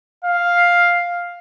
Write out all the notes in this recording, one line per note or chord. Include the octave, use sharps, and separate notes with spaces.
F5